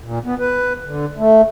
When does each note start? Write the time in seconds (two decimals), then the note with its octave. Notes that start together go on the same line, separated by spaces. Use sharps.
0.04 A#2
0.25 B3
0.39 B4
0.85 D3
1.17 A3